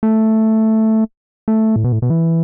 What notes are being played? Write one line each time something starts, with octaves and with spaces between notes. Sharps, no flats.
A3
A3
A2
B2
A2
B2
E3